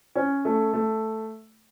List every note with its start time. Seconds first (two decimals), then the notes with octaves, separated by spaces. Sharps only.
0.16 C#4
0.45 A3
0.73 A3